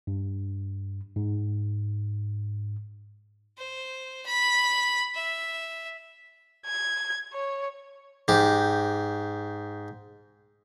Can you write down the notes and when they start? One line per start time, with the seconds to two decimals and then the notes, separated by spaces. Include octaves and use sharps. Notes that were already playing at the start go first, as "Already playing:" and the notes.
0.07 G2
1.16 G#2
3.58 C5
4.26 B5
5.15 E5
6.66 G#6
7.33 C#5
8.28 G#2 G4